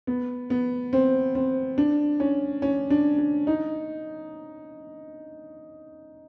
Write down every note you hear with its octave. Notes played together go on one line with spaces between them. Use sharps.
B3
B3
C4
C4
D4
C#4
C#4
D4
D4
D#4